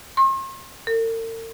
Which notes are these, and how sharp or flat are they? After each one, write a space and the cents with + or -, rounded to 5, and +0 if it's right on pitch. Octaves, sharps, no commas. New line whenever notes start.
C6 +45
A#4 -45